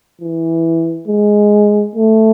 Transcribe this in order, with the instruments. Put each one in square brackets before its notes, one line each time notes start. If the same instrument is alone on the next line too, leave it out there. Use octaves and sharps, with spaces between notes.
[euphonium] E3
G#3
A3